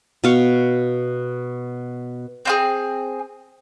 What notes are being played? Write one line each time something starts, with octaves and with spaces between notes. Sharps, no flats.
B2 F5 C#6
C4 F4 G#4